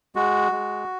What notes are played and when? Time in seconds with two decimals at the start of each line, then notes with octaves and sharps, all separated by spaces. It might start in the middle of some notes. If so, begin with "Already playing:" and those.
0.15 G#3 F#4
0.52 G#3